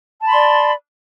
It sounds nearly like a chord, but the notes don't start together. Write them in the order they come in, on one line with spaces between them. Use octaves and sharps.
A5 B5 C6 D5